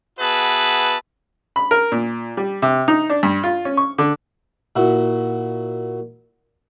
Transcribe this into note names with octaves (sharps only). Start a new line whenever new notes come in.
B3 F#4 G#4 B4 E5 A5
B5
A#4
A#2
G3
C3
D#4
D4
G2
F4
C#4
C#6
D3
A#2 E4 F#4